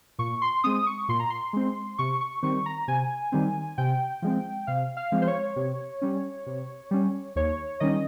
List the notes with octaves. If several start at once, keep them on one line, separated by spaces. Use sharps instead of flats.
A#2 C#6
C6
G#3 C4 D#6
C#6
A#2 C6
A#5
C6
G#3 C4
C3 C#6
C#6
D#3 G3 C4 C#6
A#5
C3 G#5
D#3 G3 C4
C3 G5
F3 G#3 C4
C3 F5
F5
F3 G#3 C4
C5
C#5
C3
G3 C#4
C3
G3 C#4
D#2 C#5
D#3 G3 C#4 D#5